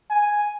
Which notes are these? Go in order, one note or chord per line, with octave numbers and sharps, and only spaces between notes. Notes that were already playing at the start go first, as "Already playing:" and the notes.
G#5